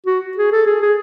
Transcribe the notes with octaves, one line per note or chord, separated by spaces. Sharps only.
F#4
G#4
A4
G#4
G#4